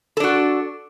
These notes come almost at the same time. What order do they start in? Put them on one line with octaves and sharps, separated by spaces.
A4 D4 F#4